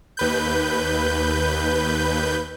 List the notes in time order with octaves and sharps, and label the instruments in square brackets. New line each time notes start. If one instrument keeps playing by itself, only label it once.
[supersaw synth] D#2 B4 G6